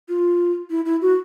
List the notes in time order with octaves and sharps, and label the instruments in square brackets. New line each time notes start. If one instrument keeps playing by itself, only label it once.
[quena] F4
E4
E4
F#4